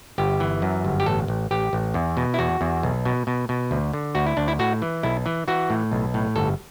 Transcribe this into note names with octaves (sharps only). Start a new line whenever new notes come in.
G1 G4
E3
F#2
G1
G4
A1 A4
A1
A1 G4
A1
E2
B2
E4
E2 F#4
E2
B1
B2
B2
B2
D2
D3
D2 F#4
E4
D2 D4
E4
A2 F#4
E3
B1 E4
E3
E3 F#4
A2
B1
A2
G1 A4